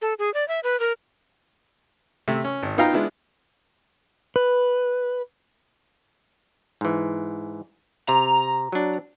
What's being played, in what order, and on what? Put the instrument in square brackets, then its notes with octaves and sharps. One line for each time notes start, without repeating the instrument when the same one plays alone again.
[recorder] A4
G#4
D5
E5
B4
A#4
[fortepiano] C3 A3
C#4
G#1
B3 D#4 F4 F5 G5 A#5
G#3 B3 D4 E4 F4
[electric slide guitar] B4
[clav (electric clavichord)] G#2 E3
[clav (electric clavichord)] C3 [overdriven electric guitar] A#5
[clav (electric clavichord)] F#3 D4